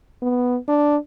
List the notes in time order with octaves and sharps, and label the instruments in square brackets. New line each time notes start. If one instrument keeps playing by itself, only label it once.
[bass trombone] B3
D4